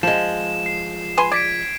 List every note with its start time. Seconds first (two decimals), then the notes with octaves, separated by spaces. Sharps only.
0.03 F3 G#3 E7
0.66 C7
1.17 B4 G#5 C6
1.32 D5 G#6 B6 D7